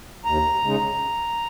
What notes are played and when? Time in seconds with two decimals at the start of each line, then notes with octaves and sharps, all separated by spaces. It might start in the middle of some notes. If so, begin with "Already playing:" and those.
0.25 D#2 A#5
0.63 C#3 G#3 D#4